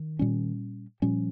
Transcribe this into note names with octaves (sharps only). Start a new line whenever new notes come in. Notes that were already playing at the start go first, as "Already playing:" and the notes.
Already playing: D#3
A#2 G3 C#4
A#2 F3 G3 C#4